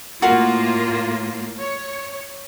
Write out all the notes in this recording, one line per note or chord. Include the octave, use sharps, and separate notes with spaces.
A2 A#3 F4 F#4 A#4 F5
C#5